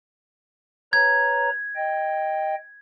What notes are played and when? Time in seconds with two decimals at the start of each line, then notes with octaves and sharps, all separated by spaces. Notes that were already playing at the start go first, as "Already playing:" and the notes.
0.93 B4 C#5 A#5 G#6
1.76 D#5 G5